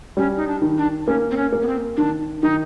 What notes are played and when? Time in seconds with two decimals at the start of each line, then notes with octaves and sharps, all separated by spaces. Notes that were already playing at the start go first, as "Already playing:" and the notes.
0.17 G3 C#4
0.37 D#4
0.47 D4
0.62 D#3
0.78 D4
1.07 A#3 C#4
1.31 C4
1.37 C#4
1.52 A#3
1.62 B3
1.67 C4
1.97 D#3 D4
2.42 D#3 D#4